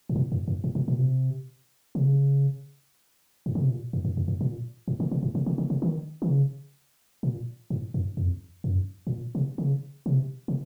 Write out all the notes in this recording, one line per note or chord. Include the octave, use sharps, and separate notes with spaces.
G#2
A#2
F#2
F#2
G#2
A#2
A#2
C3
C3
C#3
G#2
C#3
C3
A#2
F#2
F#2
F2
F#2
A#2
G#2
C#3
C3
G#2
C3
C#3
C#3
C3
D#3
D#3
C#3
A#2
G#2
F#2
F2
F#2
G#2
A#2
C3
C#3
C3
C3